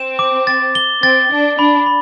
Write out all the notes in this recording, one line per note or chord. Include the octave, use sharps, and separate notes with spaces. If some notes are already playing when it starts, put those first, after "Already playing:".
Already playing: C4 E7
D6
A6
G7
C4 A6
D4 A6
D4 B5
B5